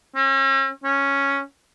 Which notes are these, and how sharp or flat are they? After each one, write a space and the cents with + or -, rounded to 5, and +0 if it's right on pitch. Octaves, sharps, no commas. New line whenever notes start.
C#4 -40
C#4 +0